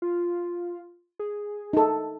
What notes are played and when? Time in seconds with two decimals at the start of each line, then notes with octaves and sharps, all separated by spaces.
0.02 F4
1.19 G#4
1.73 D#4 A4